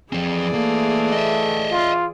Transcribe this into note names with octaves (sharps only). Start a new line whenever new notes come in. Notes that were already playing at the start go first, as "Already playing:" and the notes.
E3 F3 C4 G#4 D5
A3 A#3
D#5 E5
F4